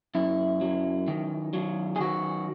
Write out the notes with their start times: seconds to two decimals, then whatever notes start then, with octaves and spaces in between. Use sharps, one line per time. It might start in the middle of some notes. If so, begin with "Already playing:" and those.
0.15 F#2 E4
0.61 F#3
1.08 D#3
1.53 F#3
1.96 G#4
2.00 D#3 F#4